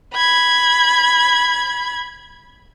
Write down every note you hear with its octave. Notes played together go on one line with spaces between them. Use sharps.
B5 G#6